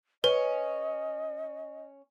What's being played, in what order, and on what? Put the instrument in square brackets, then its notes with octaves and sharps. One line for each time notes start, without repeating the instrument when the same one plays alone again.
[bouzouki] C#4 [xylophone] B4 [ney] D#5